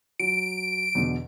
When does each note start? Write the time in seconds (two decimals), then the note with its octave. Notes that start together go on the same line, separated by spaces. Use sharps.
0.19 F#3 D7
0.95 E2 B2 D3